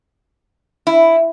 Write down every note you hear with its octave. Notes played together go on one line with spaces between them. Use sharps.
E4